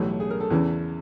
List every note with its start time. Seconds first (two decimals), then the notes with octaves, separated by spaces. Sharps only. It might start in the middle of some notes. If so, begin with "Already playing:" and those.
Already playing: B1 A2 E3 G3
0.20 G#4
0.30 A#4
0.41 A4
0.50 E2 C#3 E3